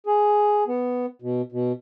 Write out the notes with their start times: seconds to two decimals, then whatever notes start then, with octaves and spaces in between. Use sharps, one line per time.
0.06 G#4
0.68 B3
1.22 B2
1.52 B2